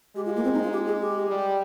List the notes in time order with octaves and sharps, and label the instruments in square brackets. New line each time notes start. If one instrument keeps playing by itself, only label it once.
[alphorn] G#3 [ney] G4
[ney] F4
A#3
C4
D#4
F4
G4
G#4
G4
[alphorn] G3